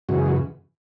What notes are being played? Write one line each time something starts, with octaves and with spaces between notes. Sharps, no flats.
F#2 C#3 E3 G#3 F#4
G#4
F#4